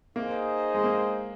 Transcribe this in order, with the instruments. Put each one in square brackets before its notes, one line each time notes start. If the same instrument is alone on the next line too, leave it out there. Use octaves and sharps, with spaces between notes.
[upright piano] A#3 [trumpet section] D#4 G#4 C5 D#5
[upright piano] G#3
A#3